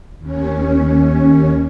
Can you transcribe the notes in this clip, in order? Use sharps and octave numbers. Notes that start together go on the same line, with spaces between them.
D#2 C#4